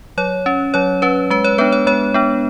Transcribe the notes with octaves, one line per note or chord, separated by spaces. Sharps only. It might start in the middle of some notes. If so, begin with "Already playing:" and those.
F#3 C#5
C#4
F#3 C#5
C#4 B4
G#3 B4
C#5
B3 D4 B4
C#5
G#3 C#5
B3 D4